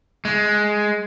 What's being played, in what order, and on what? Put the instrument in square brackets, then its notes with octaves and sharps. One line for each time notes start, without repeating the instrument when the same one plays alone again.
[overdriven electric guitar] G#3